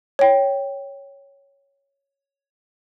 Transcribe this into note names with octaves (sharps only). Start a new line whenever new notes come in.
C#5 G5